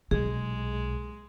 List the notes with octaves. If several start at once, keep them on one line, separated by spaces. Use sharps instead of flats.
B1 A#2 G#3 G#4